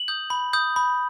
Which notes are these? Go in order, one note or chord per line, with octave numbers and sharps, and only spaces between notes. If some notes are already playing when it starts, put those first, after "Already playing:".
Already playing: F#7
D#6 G6
B5
D#6 G6
B5